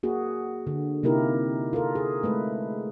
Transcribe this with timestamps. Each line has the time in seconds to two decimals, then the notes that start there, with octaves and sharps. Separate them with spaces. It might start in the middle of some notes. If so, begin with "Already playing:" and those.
0.03 A#3 F#4 G#4
0.67 D3
1.03 C3 A#3 D#4 E4 G4 A#4
1.73 F4 A4 A#4
1.95 G#4
2.23 G#3 A3 B4